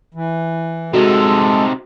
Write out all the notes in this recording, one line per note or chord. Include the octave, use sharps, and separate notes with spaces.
E3
C3 G#3 D#4 F#4 A4